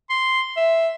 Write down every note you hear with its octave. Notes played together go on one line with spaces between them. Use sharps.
C6
E5